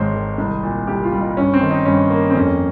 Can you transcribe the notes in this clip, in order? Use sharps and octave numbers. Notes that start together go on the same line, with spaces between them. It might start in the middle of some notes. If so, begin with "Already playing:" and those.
Already playing: G#1 G#2 G#3 C5 C#5
D#3
C2
A#2
C2 G4
F4
G3
D#4
G2 C#4
C4
D#3
D#4
G2 C#4
A#3
C4
F2 C#4